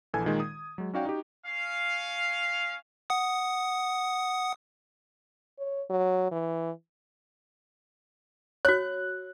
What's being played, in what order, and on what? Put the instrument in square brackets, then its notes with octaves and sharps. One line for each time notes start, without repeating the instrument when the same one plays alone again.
[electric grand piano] A#1 E3 A4 G#5 G#6
A#2 D#3 G#3
D#6
F#3 G#3
C#4 D#4 F#4 D5 F5 G5
D#4 F#4 G4
[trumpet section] C#4 F5
[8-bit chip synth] F#5 D#6
[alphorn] C#5
F#3
E3
[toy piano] F#4 C#5 [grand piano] F#6